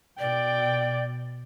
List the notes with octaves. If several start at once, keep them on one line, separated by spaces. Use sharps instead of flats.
B2 D5 G5 D6